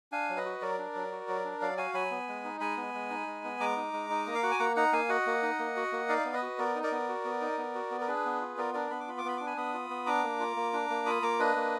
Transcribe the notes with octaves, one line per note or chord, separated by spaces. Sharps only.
D4 F5 G#5
F#3
B4 D#5
F#4
F#3 A#4 D5
D4
F#3
F#4
F#3
D4
F#3 D5 F5
F#4 F5 G#5
F#3 G#5 B5
B3
G#3
D#4
G#3 G#5 B5
B3
G#3
D#4
G#3
B3
G#3 A#5 D6
D#4
G#3
D#4
A#3 D#5
F5
F#4 F#5
G#5
A#3 F#5 A#5
D#4 F#5 A#5
A#3 F5 G#5
F#4 D#5 F#5
A#3
D#4
A#3
F#4
A#3
D#4 D5 F5
B3
B4 D#5
F#4
B3 A#4 D5
D#4
A#4 D5
B3
F#4
B3
D#4
B3
F#4
B3
A#4
D4 G#4 B4
B3
F4
B3 A#4 D5
D4 A#4 D5
B3 B5
D6
F4 B5
D6
B3 B5
D4 D6
G#5 B5
B3 B5 D#6
F4
B3
D4 A#5 D6
A#3
F4
A#3
D4
A#3
F4 B5 D#6
A#3 A#5 D6
D4 B4 D#5
A#3